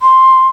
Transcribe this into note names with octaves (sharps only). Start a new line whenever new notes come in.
C6